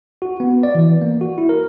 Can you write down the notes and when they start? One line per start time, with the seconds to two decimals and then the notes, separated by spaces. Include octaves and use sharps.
0.22 F#4
0.40 B3
0.63 D5
0.75 E3
1.02 A#3
1.21 F#4
1.38 E4
1.49 A#4